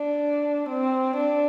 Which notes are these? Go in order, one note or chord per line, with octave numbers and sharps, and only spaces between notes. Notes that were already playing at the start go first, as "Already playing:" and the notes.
Already playing: D4
C4
D4